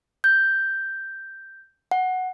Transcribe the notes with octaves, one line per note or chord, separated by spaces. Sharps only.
G6
F#5